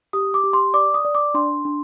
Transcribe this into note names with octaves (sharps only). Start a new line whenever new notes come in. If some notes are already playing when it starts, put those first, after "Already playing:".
G4 D#6
D6
G4
C6
D5 D6
D#6
D5
D6
D4 C6
D4